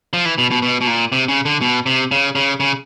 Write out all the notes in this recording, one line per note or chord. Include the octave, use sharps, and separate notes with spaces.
F3
E3
B2
B2
B2
B2
A#2
C3
C#3
D3
B2
C3
C#3
C#3
C#3